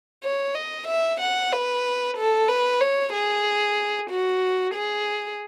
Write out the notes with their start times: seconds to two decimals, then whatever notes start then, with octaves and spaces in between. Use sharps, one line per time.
0.23 C#5
0.55 D#5
0.87 E5
1.20 F#5
1.52 B4
2.16 A4
2.48 B4
2.80 C#5
3.13 G#4
4.09 F#4
4.73 G#4